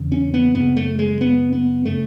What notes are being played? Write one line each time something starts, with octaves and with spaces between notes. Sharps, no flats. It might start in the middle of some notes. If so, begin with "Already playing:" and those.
Already playing: E2 C#3
C#4
B3
F#2 C#3 B3
A3
G#3
B3
B3
C#3 A3